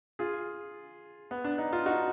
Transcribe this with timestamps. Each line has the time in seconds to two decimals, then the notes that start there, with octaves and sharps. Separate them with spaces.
0.19 F4 G#4
1.31 B3
1.44 D4
1.58 D#4
1.73 F4
1.86 D#4 F#4